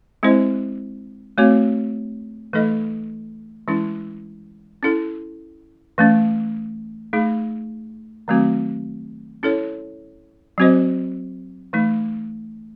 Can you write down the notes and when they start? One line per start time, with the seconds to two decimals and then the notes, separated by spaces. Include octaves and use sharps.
0.23 G#3 C4 E4 C5 D#5
1.38 A3 C4 F#4 C#5
2.53 E3 A3 D#4 A4 D#5
3.68 E3 G#3 C#4 E4
4.83 C#4 E4 A4
5.98 E3 A3 C#4
7.13 A3 D#4 G#4
8.28 D#3 F#3 A3 C4 F#4
9.43 C#4 E4 A4 C#5
10.58 F#3 C4 F#4 C5 D#5
11.73 E3 A3 D#4